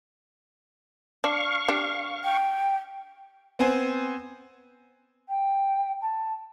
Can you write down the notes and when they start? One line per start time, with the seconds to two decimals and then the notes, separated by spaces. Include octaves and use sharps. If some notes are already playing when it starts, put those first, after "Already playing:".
1.24 D4 F5 C#6
1.68 D4 G4
2.24 G5
3.59 B3 C4 C5 G#5
5.29 G5
6.01 A5